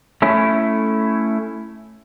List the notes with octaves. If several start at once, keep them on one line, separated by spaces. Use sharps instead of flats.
A3 C#4 E4